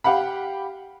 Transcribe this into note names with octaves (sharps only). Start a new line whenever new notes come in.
G4 F5 F#5 B5